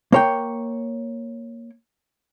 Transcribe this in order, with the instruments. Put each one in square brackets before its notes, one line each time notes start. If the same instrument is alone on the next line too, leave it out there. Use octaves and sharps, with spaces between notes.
[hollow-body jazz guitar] A#3 C#5 G5